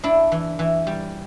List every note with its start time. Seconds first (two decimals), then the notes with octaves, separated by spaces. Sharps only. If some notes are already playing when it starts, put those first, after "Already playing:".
0.04 D4 E4
0.32 E3
0.59 E3
0.87 G3